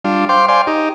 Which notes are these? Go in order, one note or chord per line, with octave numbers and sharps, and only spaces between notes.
G3 D4 F4
C5 F5 G5 C6 D6
C5 D5 F5 G5 G#5 C6
D#4 G4